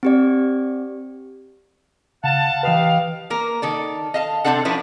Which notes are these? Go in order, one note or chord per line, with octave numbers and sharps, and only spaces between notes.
C4 G4 D5
C#3 F5 F#5 A5
E3 G4 B4 D#5 F5
A#3 A#4
D#3 A4 D5
D#5 F5 A5
C3 A#3 C4 D4 A4 F#5
F3 C#4 D4 E4 B4